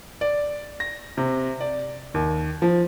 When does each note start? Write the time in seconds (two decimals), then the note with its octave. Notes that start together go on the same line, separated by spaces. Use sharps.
0.21 D5
0.80 A#6
1.17 C3
1.60 D5
2.14 D#2
2.62 F3